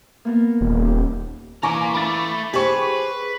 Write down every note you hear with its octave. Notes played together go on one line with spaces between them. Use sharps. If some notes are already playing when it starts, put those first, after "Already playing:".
A#3 B3 A#4
D#1
G4
E3 F4 A#4 G#5 C#6 D6
A3 B5 D6 A6
G4 G#4 B4 C5 C#6